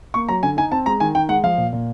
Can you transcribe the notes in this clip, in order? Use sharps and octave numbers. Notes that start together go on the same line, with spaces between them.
A#3 C#6
F#3 A#5
D3 G#5
D#4 G#5
C4 A5
G#3 A#5
D#3 G#5
D#3 G5
G#3 F#5
F3 F5
A#2
A#2